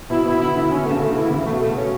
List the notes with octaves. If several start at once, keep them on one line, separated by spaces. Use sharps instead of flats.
B2 E4
B2 E4
D3 E4
D3 E4
D3 C#4
A3
C#3
A3
D3 E4
C#3 E3
A3
B2
A3
C#4